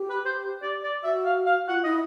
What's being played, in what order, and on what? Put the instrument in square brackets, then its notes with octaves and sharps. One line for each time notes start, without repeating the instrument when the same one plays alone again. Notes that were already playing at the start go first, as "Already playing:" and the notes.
Already playing: [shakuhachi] G4
[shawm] B4
C5
D5
D5
[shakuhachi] F#4 [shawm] E5
[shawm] F5
F5
[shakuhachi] F4 [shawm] F#5
[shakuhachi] E4 [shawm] D#5